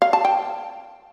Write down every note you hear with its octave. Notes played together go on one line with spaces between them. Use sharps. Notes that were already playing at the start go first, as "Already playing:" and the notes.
F5
A5
G5